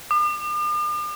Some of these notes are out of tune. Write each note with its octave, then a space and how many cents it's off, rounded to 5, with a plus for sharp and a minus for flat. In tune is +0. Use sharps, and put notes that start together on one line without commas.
D6 +45